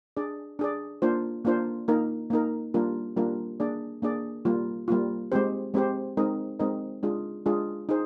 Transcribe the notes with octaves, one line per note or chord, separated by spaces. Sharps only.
D4 G#4 D5
D4 G#4 D5
A#3 D4 F4 C5
A#3 D4 F4 C5
A#3 D#4 A#4
A#3 D#4 A#4
G3 A#3 D4 F4 A#4
G3 A#3 D4 F4 A#4
A#3 D4 G#4 D5
A#3 D4 G#4 D5
G3 A#3 F4
G3 A#3 F4
G#3 C4 G4 C5
G#3 C4 G4 C5
G#3 C4 D#4 A#4 D#5
G#3 C4 D#4 A#4 D#5
G#3 D4 F4 G#4
G#3 D4 F4 G#4
D#4 G#4 C5